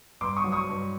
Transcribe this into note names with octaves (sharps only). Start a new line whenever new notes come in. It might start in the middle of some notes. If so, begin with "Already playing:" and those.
G2 C6 D6
C#6 D#6
F#3
C#6 D#6
G2